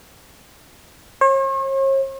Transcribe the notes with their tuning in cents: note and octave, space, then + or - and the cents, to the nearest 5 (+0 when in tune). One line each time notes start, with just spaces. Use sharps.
C#5 -45